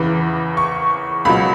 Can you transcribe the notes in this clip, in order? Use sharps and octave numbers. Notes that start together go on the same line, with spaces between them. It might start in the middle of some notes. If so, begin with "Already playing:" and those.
Already playing: E2 C#3 E3
C#6
C#2 B2 F#3 B5